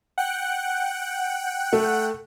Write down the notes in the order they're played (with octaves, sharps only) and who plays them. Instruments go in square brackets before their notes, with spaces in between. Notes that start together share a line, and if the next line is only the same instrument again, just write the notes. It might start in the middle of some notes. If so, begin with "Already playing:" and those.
[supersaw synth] F#5 G5 F#6
[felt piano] A3